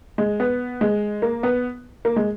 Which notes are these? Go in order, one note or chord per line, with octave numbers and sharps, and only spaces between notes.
G#3
B3
G#3
A#3
B3
A#3
G#3